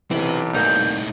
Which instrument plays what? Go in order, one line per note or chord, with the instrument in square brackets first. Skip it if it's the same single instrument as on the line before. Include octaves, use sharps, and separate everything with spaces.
[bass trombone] B1 [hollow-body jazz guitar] E3 [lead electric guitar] C4 G4
[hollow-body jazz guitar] C2 A#3 [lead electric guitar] A2 D#4 [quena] G6